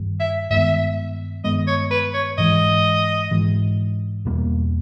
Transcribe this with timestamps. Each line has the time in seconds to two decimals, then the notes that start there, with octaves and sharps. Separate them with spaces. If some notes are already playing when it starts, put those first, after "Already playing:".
Already playing: G2 D#3 G3
0.20 E5
0.50 G2 D#3 G#3 B3 E5
1.44 G2 D#3 G#3 B3 D#5
1.67 C#5
1.91 B4
2.14 C#5
2.38 G#2 E3 G#3 D#5
3.31 G#2 E3 G#3
4.25 E2 B2 G3 A#3